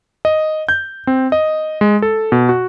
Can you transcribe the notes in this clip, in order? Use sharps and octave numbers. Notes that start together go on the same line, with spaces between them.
D#5
G6
C4
D#5
G#3
A4
B2
F#4